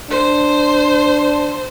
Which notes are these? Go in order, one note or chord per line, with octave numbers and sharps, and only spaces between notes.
D4 C5